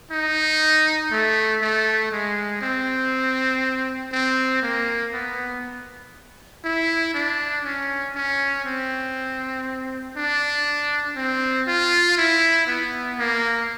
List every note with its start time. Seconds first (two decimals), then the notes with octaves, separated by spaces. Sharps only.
0.11 D#4
1.11 A3
1.62 A3
2.11 G#3
2.61 C4
4.12 C4
4.62 A#3
5.13 B3
6.64 E4
7.14 D4
7.65 C#4
8.15 C#4
8.65 C4
10.16 D4
11.16 C4
11.67 F4
12.17 E4
12.67 B3
13.18 A#3